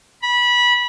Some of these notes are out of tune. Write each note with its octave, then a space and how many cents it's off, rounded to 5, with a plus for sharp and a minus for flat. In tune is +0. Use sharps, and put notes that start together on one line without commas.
B5 -20